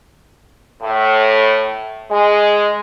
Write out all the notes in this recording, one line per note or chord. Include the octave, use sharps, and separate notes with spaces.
A2
G#3